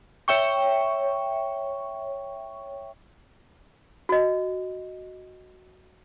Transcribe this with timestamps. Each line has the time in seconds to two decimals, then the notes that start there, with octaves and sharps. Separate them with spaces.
0.28 C#5 E5 G5 C#6
4.09 F#4 D#5